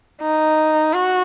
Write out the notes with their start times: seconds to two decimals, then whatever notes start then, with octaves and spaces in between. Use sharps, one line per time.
0.22 D#4
0.94 F#4